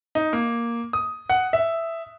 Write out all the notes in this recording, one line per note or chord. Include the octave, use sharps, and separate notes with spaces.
D#4
A#3
D#6
F#5
E5